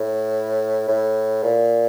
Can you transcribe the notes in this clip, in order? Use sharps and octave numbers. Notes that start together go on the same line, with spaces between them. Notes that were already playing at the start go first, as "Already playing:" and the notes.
Already playing: A2
A2
A#2